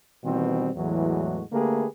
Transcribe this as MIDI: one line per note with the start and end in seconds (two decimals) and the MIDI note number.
0.24 0.69 47
0.24 0.69 51
0.24 0.69 52
0.24 0.69 55
0.24 0.69 60
0.75 1.42 40
0.75 1.42 45
0.75 1.42 52
0.75 1.42 54
0.75 1.42 56
0.75 1.42 66
1.52 1.86 50
1.52 1.86 57
1.52 1.86 58
1.52 1.86 67
1.52 1.86 68
1.52 1.86 71